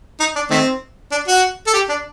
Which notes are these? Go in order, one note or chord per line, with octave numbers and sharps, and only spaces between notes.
D#4
D4
D#3 A3 C4
D4
F#4
A4
G4
D4